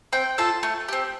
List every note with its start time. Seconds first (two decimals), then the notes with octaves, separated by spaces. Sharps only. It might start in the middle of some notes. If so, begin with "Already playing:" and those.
0.13 C4 G5
0.38 F4 A4 A5
0.63 A3
0.88 C4 G4